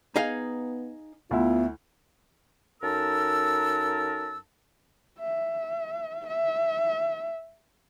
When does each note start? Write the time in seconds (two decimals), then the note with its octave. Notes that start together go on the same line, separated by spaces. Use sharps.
0.16 B3 D#4 G#4 F5
1.31 D2 B3 E4 F4
2.82 F#2 D#4 A4 A#4 A5 E6
5.19 E5
6.27 E5